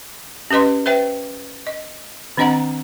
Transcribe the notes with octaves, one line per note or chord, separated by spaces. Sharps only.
C#4 G4 B4 D#5 C6
B4 C5 E5 G5
D#5
D#3 C4 D4 D#5 F#5 A#5